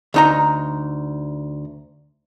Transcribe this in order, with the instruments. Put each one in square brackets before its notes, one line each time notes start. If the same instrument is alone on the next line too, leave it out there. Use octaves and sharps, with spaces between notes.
[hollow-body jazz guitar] D2 D#4 A#5